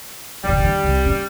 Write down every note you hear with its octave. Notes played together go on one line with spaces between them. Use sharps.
D#1 C#3 G3
D#2 D3
C2
C#4